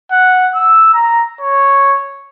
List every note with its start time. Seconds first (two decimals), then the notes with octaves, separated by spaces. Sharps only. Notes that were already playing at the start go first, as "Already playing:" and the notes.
0.11 F#5
0.56 E6
0.94 A#5
1.41 C#5